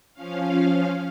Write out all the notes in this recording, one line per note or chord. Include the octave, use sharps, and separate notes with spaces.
F3 C#4 F5